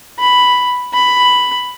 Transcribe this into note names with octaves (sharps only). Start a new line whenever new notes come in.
B5
B5